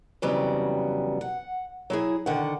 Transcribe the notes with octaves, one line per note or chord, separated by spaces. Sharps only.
F2 C#3 E3 F#3 G3 B3
F#5
F#3 E4 G#4
D3 D#3 F#5